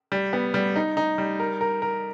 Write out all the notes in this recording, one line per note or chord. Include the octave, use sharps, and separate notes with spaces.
G3
B3
G3
D#4
D#4
G3
A#4
A#4
A#4